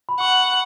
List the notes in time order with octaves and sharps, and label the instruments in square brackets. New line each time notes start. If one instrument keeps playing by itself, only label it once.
[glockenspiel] B5
[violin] F#5 [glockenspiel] C#6